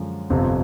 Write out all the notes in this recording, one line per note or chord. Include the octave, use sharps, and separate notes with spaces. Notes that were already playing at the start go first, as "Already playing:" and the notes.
Already playing: F#2 D3 F3 G#3
G1 F2 C3